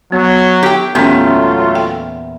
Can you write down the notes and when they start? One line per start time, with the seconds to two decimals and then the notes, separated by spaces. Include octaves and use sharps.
0.12 F#3 B3
0.63 G4 G5
0.95 E2 A#2 F#3 A3 B3 C#4 F4 G4
1.75 G5